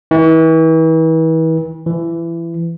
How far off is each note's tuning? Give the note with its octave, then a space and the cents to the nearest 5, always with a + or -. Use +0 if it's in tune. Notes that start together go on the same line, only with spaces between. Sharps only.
E3 -35
E3 +25